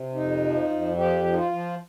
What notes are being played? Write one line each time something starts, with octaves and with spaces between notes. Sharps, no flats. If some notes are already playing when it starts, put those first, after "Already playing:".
Already playing: C3
F2 D#4
F3
F2
F3 G4
F3
D#4
F4
F3